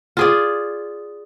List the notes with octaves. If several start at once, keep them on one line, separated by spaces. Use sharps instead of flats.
F4 G#4 D5